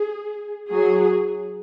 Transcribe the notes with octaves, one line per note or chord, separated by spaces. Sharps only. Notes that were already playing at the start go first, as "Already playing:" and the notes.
Already playing: G#4
F#3 G#4